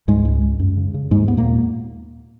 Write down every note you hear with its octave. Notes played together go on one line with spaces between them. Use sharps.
C#2 G#2 G#3
C#2
C#2
F#2
C#3
C#3
D#2 G#2 G#3
D#2 B3
A#2 A#3